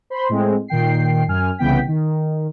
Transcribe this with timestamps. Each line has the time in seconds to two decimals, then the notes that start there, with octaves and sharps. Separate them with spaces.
0.10 C5 B5 C6
0.29 A2 G#3 C4
0.68 A#2 D#3 G5 C7
1.28 F#2 G#5 F6
1.58 C2 C#3 E3 B3 G5 B6
1.87 D#3